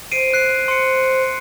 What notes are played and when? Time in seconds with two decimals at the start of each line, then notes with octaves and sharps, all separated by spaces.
0.12 C5 C7 D7 D#7
0.34 F#6 C7
0.68 C6 C#7